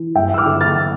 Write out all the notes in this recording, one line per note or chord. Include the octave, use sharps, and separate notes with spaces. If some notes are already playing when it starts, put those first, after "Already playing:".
Already playing: E3
G2 E5 G5
E6
D6 F6
D3
F6 A6